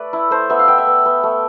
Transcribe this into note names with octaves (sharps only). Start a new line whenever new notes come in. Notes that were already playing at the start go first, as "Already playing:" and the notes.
Already playing: A3 B4 D5
E4
A3 C5
B3 E5
F5
B3 G5
E5
B3
B3
A3